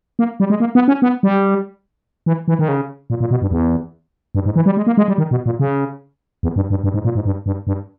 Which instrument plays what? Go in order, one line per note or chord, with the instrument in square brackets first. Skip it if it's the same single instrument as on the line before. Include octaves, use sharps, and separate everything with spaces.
[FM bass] A#3
G3
G#3
A#3
B3
C#4
B3
G3
E3
E3
D#3
C#3
A#2
A#2
B2
G2
E2
G2
G#2
E3
G3
G#3
A#3
G#3
G3
D#3
B2
A#2
C#3
E2
G2
G2
G2
G#2
A#2
G#2
G2
G2
G2